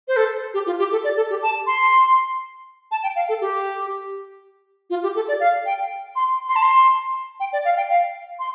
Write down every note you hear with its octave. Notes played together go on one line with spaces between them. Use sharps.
C5
A4
G4
F4
G4
A4
D5
A4
G4
A5
C6
A5
G5
F5
A4
G4
F4
G4
A4
D5
F5
G5
C6
C6
A5
C6
G5
D5
F5
G5
F5
C6